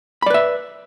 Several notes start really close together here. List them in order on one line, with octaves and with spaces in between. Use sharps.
B5 D5 B4 E5